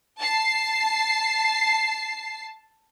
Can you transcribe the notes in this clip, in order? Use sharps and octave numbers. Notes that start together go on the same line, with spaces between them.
A5 C7